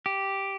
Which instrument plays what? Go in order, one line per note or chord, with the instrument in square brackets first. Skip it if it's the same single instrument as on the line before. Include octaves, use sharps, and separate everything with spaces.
[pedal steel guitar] G4